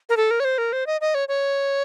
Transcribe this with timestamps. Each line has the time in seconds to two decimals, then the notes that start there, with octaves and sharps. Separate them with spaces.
0.09 A#4
0.17 A4
0.31 A#4
0.40 C#5
0.45 C5
0.58 A#4
0.73 C5
0.87 D#5
1.01 D#5
1.15 C#5
1.28 C#5